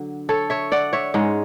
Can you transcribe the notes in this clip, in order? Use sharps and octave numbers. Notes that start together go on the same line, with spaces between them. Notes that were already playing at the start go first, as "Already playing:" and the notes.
Already playing: D3 F#3
A4 C#5
C#5 E5
D5 F#5
C#5 E5
G#2 G#3 C#4